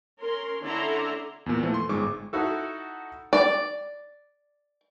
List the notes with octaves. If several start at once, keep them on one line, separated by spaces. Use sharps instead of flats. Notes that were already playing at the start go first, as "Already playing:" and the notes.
C#4 A#4 C6
D3 C#4 E4 A4 A#5 C6
E2 A#2
E3 F3 A3
C6
G1 G#2 G#3 C#6 D6
D#4 E4 F#4 A4
D5